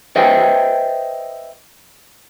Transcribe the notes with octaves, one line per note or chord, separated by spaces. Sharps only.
B4 C5 D#5 E5 G5